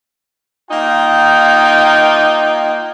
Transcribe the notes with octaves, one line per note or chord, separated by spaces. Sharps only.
A#3 D#4 F4 G5